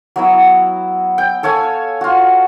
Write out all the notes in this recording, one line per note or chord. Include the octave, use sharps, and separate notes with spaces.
F#3 B3 E4
G5
A4 C#5 F5 G#5
F4 F#4